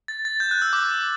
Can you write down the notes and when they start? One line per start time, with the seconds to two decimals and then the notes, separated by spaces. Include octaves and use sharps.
0.08 A6
0.25 A6
0.40 G6
0.51 F#6
0.62 E6
0.73 D6